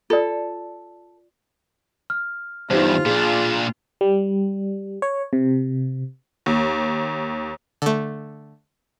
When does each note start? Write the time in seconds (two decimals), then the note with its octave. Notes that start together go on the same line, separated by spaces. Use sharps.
0.10 F4 A4 D5
2.10 F6
2.70 E2 G2 D#4 F4 G4 C5
3.06 A#2 D4 G#4
4.01 G3
5.02 C#5
5.33 C3
6.46 D#2
7.82 D3 A3